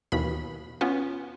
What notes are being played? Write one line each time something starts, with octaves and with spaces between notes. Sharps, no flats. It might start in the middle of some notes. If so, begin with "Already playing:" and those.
D#2 B2 E3 B5
B3 C#4 F4